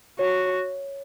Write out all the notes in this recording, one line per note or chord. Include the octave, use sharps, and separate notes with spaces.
F#4 C#5
C#5